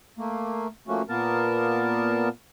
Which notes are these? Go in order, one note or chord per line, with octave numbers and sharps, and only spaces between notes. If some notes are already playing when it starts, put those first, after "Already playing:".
A3 A#3
F3 A3 A#3 C#4 F#4
A#2 A#3 B3 A#4 A5